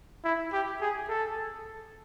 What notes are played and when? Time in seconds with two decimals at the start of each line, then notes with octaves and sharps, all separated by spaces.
0.24 E4
0.53 G4
0.81 G#4
1.09 A4